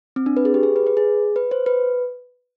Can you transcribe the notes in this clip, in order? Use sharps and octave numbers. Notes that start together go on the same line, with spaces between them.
C4
D4
B4
G#4
G4
G#4
B4
B4
G#4
B4
C5
B4